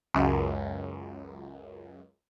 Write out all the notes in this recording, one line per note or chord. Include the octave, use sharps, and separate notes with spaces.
C#2 F#2